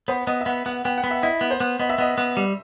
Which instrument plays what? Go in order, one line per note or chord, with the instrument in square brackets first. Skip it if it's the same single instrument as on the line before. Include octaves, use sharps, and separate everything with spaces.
[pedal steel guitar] B3 [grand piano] C5
[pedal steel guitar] B3 [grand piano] D#5
[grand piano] E5
[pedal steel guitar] B3 [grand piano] F#5
[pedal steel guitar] B3 [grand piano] F#5
[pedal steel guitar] B3 [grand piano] G5
[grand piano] F#5
[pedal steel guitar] B3
[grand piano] E5
[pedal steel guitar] E4 [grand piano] D#5
[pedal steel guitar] B3
[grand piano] C5
[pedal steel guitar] B3
[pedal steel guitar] B3 [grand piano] D#5
[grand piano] E5
[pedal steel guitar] B3 [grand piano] D#5
[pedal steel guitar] B3
G3